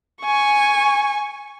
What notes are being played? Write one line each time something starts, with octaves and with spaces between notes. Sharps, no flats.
G#5 C#6